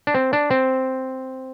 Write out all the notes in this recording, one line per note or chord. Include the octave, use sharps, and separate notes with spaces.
D4
C4
D4
C4